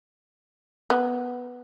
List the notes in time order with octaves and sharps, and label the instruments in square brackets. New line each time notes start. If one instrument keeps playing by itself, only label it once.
[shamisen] B3